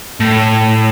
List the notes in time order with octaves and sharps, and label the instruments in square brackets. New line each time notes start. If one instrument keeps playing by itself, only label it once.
[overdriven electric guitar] A2